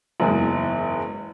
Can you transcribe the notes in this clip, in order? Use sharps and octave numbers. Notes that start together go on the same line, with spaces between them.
F#1 E2 G#2